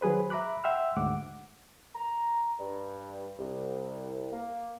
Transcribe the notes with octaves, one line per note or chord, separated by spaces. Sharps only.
D#3 F#3 G#4 B4 C5
E5 A#5 B5 D6 F#6
E5 F#5 G5 C6 E6 F6
D2 G#2 F#5 D6
A#5
G2
C2
A#3